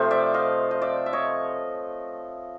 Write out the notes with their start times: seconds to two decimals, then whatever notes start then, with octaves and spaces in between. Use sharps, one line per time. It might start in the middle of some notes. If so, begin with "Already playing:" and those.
Already playing: C3 F3 A3 C5
0.11 D5 E5
0.34 D#5 F5
0.71 D#5
0.82 D5 E5
1.06 E5
1.13 C#5 D#5